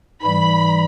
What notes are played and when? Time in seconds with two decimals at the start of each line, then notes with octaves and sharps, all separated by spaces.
0.22 G#2 E3 G3 B5